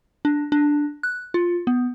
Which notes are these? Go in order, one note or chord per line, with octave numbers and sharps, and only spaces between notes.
D4
D4
F#6
F4
B3